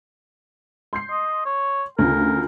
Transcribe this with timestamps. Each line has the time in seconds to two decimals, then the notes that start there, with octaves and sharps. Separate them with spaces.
0.93 C6 G6 C7
1.11 D#5
1.46 C#5
1.99 D2 C#3 F4 A#4